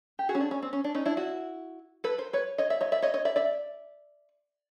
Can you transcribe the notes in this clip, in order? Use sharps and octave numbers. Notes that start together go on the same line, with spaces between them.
G4
F#4 G#4
C#4
D4
C#4
C4
C#4
D4
C#4 D#4
D4 E4
E4 F#4
A4 B4
A#4 C5
B4 C#5
C#5 D#5
D5 E5
C#5 D#5
D5 E5
C#5 D#5
C#5 D#5
D5 E5
D5 E5